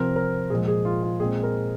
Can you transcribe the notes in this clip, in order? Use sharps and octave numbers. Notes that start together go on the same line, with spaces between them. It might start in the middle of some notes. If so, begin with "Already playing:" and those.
Already playing: C3 F3 C4 A#4
A#4
A#2 F3 G#3 G#4
G#4
F4
F4
A#2 G#3 C4 G#4
A#4